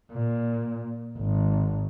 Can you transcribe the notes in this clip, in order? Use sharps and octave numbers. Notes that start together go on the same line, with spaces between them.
A#2
G#1